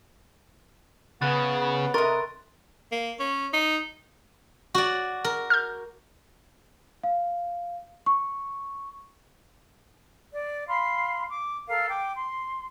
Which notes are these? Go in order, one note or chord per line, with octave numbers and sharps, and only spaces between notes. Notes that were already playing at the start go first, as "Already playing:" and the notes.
C#3 B3 F#5 B5 F#6 A6
C3 A#4 D#5 A#5 C6 C#6 A6
A#3
C#4
D#4
F#4 D5
A#4
F6 G6
F5
C#6
D5
F5 B5 C6
D6
A4 A#4 F5
G5 D6
C6